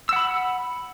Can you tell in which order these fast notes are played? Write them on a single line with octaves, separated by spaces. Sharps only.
E6 F#5 B5